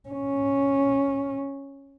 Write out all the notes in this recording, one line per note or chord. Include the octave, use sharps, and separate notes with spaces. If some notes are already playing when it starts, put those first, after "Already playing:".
C#4